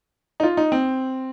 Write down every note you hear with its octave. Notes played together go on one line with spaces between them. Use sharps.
D#4
F4
D#4
C4